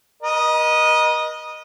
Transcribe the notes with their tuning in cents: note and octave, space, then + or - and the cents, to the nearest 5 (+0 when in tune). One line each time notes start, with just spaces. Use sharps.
A#4 +45 D#5 -5